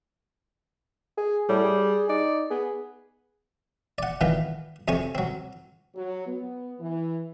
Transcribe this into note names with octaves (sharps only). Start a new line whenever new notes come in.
G#4
A2 G3
G#4
D#4 D5
B3 G#4
D5 F#5
A#2 D#3 E3 B3
F2 C3 C#5 G#5 C#6
F#3 C4
F#3
B3
E3